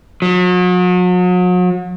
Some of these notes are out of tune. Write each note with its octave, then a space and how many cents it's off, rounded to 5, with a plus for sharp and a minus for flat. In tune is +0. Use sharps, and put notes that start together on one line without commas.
F#3 -40